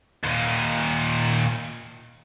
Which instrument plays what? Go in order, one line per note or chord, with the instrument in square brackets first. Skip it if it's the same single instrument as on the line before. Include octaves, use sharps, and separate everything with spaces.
[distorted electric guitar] D#2 A#2